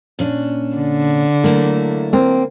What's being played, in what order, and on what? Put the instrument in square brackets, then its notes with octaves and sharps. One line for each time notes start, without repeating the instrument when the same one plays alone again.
[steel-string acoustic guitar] A#2 C#4 D4
[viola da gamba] D3
[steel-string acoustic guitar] F#3 A3 E4 [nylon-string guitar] A#3
[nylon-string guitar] A#3 C4